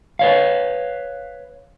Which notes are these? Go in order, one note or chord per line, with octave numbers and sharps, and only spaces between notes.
B4 C#5 F5